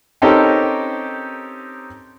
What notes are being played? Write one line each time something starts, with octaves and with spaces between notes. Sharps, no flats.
C4 C#4 D#4 G4 A4 A#4